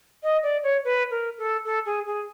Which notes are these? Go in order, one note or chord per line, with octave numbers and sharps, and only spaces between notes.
D#5
D5
C#5
B4
A#4
A4
A4
G#4
G#4